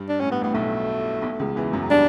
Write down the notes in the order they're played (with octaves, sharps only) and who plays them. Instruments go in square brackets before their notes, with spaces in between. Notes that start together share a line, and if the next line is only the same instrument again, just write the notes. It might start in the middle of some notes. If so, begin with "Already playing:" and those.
Already playing: [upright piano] G2
[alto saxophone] D4
[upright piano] A2 [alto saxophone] C#4
[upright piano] G2 [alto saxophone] B3
[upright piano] A1 A2 [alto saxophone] B3
[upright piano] B1 B2 [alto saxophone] A3
[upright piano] B1 B2
C#2 C#3
E2 E3
F#2 F#3
[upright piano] G3 [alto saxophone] D4